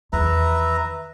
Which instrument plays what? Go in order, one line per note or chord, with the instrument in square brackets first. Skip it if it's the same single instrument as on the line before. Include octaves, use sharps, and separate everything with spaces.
[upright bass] E2 D#3 [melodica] B4 E5 A#5